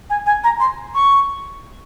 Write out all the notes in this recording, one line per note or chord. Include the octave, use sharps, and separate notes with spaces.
G#5
G#5
A#5
C6
C#6